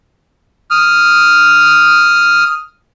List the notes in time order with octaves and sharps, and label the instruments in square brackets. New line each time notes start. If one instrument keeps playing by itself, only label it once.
[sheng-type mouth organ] D#6 F6